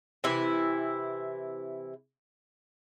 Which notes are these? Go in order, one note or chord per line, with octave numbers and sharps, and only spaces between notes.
C3 E3 E4